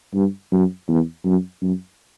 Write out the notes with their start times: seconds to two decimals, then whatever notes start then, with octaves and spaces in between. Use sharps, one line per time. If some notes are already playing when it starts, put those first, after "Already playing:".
0.14 G2
0.52 F#2
0.89 E2
1.25 F#2
1.62 F#2